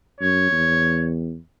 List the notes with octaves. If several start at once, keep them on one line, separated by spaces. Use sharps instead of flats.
F#2 C#5
E2